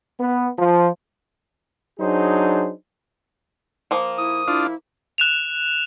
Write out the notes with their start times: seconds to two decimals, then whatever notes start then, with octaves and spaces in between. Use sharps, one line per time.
0.20 B3
0.58 F3
2.00 F#3 D4 D#4 G#4 C5
3.91 F3 A#3
4.18 E4 D#6
4.48 D4 E4 F4
5.18 F#6 E7 F7